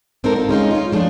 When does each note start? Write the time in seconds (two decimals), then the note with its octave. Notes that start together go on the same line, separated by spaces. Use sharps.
0.24 G#2 C4 D4 D#4 A4 A#4
0.36 F4
0.49 G#3 C#4 D#4 F4
0.71 A#3 C#4 F4
0.92 F3 G3 A3 C#4 D4